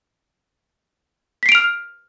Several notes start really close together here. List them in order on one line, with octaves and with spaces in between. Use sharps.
B6 C7 D7 F7 F6